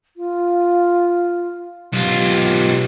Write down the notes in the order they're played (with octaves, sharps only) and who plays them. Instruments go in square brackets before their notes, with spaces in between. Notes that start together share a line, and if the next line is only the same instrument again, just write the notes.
[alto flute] F4
[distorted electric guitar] B1 F4 [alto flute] G4